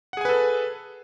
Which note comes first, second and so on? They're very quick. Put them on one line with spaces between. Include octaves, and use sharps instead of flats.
F#5 G#4 G#5 B4 A4